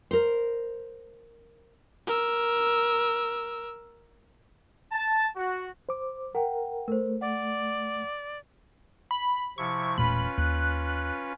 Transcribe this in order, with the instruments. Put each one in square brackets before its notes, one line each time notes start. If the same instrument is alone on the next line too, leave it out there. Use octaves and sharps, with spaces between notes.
[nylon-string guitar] A#4 C5
[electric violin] A#4 E6
[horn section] A5
F#4
[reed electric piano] C5 D6
[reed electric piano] A#4 [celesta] F#5 G5
[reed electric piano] A3 [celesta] A#4 C5
[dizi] D5 [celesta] F#5
[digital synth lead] B5
[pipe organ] C3 F3 E4 [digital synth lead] C#6
[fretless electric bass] E1 A#2 A3 [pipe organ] C#4 F4 B4 [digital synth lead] B5
[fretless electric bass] D#2 [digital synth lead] F#6